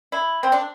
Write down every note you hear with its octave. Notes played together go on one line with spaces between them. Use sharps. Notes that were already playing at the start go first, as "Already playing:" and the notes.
E4
C4
D4